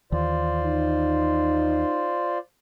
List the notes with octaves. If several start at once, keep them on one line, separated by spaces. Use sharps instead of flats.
D#2 D#3 E3 F4 C5 D5
D#4